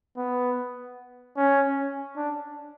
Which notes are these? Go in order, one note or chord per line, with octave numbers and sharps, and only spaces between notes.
B3
C#4
D4